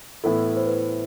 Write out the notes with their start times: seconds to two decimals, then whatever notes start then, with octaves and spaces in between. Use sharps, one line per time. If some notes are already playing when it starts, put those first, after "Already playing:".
0.24 A2 E3 B3 E4 A4
0.57 C5
0.67 B4